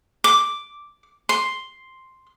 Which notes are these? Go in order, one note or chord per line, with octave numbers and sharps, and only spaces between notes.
D6
C6